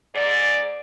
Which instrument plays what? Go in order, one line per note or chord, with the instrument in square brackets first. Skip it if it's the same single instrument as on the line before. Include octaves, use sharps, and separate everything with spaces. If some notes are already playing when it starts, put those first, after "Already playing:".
[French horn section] G#2 D5